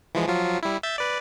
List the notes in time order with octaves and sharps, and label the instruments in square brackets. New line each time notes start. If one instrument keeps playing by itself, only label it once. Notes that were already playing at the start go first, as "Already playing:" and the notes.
[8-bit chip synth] E3 F3 G#3
F3 F#3 F4
G3 E4
E5 G6 A6
B4 D5